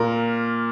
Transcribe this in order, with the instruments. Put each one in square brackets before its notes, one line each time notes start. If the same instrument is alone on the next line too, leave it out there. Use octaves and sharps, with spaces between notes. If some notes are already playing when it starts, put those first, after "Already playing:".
Already playing: [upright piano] A#2 A#4